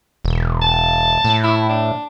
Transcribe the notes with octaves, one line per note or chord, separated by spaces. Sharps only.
E1
A5
A2
E4
D4